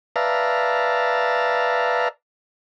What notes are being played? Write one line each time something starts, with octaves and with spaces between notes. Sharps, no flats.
B4 D5 E5 F5 A5 A#5